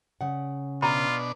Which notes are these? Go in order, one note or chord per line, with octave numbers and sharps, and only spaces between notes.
C#3 F#5
B2 D4 F4 A#5 B5